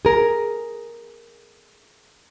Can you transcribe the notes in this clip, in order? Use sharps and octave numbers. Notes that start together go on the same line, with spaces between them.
G#4 A#4